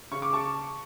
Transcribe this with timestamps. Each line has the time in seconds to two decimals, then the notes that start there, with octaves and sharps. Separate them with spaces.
0.11 C#3 C#6
0.22 D6
0.33 A5 C#6